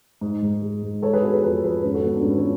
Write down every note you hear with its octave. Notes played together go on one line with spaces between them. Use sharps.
G#2
G#2
G#3
G#2
G#3 A4 C#5
G#4 B4
B3 F#4 A4
G#4 B4
F2 G#4 B4
F2 G#4 B4
G#2 C#4
F#4 A4
B3
D4
G#2 C#4
B3
C#4